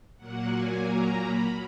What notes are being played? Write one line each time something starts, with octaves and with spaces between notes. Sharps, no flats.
A#2 F#3 A#3 F#5
G#5
A#5
B5